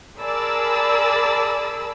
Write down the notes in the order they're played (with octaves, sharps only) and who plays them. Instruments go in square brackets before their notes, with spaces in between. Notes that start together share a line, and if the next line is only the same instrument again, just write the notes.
[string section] G#4 A#4 D5 A5 B5 E6